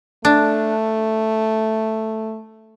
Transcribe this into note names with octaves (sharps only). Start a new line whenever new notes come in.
A3 D4